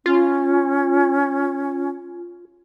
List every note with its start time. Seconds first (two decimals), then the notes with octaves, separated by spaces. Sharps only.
0.06 C#4 F4